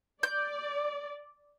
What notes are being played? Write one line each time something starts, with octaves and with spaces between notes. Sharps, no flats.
D5 G6